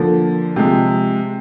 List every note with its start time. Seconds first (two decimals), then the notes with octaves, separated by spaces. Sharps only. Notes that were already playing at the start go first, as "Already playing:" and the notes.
Already playing: D3 F3 A#3
0.56 C3 F3 G#3